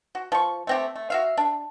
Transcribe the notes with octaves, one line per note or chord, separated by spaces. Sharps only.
F#4
F3 C#6
A3 C4 G4
A3
F#4 E5 F5
D4